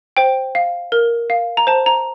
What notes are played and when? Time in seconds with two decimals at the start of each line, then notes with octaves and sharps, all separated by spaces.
0.17 C5 G5
0.55 F5
0.92 A#4
1.30 F5
1.57 A#5
1.67 C5 A5
1.86 A#5